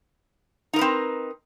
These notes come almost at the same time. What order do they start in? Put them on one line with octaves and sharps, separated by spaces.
D#4 A#4 B4 C4